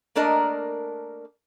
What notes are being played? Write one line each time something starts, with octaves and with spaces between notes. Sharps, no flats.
A3 A#3 D4 A#4 D#5